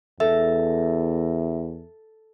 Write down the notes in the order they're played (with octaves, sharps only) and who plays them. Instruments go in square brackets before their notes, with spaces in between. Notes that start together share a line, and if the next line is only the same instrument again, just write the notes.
[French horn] E2 [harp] A4 [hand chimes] E5